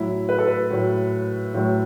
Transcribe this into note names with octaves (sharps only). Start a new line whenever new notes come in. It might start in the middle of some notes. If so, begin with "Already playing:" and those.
Already playing: A2 F#3 E4
B4
A4
B4
A2 F#3
A2 F#3